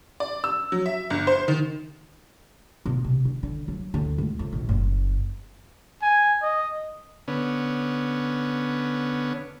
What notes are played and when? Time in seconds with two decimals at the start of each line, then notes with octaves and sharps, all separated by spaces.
0.20 D5
0.44 E6
0.72 F#3
0.86 E5
1.10 G1
1.27 C5
1.48 D#3
2.86 B2
3.04 C3
3.25 D3
3.43 D3
3.68 F#3
3.94 D2
4.18 C#2
4.39 F2
4.53 A#1
4.69 F#1
6.02 G#5
6.43 D#5
7.28 D3 B3 C#4